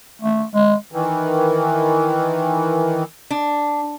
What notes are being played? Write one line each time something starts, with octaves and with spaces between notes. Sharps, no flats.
A3
G#3
D#3 E3
D4